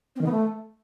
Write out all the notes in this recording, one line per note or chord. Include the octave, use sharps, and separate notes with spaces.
C4
D#3
B3
A3